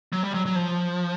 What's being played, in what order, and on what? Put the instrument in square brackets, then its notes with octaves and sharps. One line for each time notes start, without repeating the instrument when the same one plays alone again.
[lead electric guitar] F#3
G3
F#3
F#3
F3